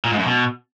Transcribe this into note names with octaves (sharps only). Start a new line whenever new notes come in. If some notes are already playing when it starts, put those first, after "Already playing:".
A#2
G#2
F#2
B2